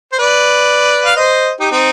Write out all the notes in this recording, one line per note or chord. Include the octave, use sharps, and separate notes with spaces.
C5
B4 D5
F5
C5 D#5
D#4 G4
C4 D#4